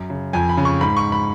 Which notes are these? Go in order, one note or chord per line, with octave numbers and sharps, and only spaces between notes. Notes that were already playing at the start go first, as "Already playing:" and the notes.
Already playing: F#2
C#3
F2 G#5
B5
C#3
C#6
G#2 B5
C#6
B5